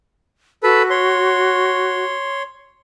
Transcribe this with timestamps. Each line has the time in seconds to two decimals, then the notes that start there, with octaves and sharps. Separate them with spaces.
0.63 F#4 A4 B4
0.90 C#5 C6